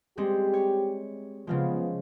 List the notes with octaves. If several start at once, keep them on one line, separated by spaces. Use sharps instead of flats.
G3 G#3 C4 G4
C#5
C#3 F3 G#3 B3 F4